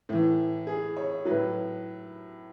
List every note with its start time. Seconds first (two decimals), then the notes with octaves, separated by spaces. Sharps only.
0.09 A2 E3
0.67 G#4
0.97 C#5
1.25 A2 F#3 B4